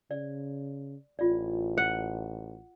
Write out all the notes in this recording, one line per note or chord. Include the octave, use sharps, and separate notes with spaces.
C#3 D5
A1 F4 D5
F#5